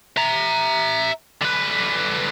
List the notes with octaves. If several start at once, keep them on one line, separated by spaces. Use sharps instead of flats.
E5 A#5
D3 B4